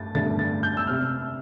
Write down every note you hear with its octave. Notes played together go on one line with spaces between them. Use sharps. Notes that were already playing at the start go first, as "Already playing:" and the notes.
Already playing: G2 A3 A6
G2 D3 A3 A6
A6
G6
E6
C3 F6